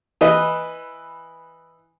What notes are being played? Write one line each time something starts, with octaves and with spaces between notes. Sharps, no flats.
E3 B4 D#5